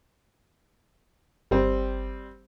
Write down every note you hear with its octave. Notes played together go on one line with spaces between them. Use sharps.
G1 G3 C4